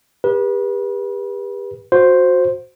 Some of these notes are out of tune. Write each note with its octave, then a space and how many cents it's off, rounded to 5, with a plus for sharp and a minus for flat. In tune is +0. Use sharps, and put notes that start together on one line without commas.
G4 +35 B4 -30
F#4 -20 C5 +0